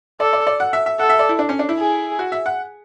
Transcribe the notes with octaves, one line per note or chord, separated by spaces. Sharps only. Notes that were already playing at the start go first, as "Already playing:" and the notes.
A4 D5
D5
D5
F#5
E5
E5
A4 F#5
E5
D5
E4
D4
C#4
D4
E4
G#4
F#4
E5
F#5